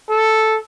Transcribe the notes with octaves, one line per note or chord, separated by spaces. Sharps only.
A4